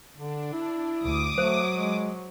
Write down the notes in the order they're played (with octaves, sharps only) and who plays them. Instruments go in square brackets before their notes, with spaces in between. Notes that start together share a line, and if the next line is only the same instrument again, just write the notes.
[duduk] D3 [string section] D4
[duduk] E4
[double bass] D2 [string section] D6 D#6
[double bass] F#3 [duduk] A3 [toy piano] C5
[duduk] G#3